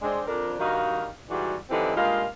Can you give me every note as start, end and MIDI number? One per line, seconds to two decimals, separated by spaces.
0.02 0.23 56
0.02 0.23 60
0.02 0.23 62
0.27 0.55 41
0.27 0.55 62
0.27 0.55 70
0.59 1.07 43
0.59 1.07 51
0.59 1.07 63
0.59 1.07 66
0.59 1.07 77
1.30 1.55 44
1.30 1.55 52
1.30 1.55 55
1.30 1.55 62
1.30 1.55 66
1.70 1.92 50
1.70 1.92 52
1.70 1.92 53
1.70 1.92 55
1.70 1.92 60
1.70 1.92 63
1.96 2.25 43
1.96 2.25 56
1.96 2.25 58
1.96 2.25 63
1.96 2.25 65
1.96 2.25 77